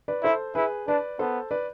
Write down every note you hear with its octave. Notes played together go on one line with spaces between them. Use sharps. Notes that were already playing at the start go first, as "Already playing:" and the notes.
B4 D5
E4 A4 C5
E4 G#4 B4
D4 B4 D5
B3 A4 C5
B4 D5